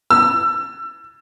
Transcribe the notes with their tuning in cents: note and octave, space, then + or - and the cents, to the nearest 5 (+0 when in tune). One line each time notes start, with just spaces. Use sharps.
E6 +25